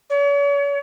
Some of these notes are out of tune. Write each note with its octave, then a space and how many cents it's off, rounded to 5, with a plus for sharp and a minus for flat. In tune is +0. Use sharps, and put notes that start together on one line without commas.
C#5 +40